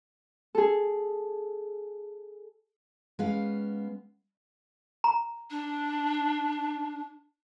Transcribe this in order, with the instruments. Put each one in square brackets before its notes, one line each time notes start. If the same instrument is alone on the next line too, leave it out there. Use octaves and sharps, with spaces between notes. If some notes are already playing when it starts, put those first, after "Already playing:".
[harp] G#4 A4
[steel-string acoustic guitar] G#3 B3 C#4 B4 F5
[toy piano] A#5
[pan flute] D4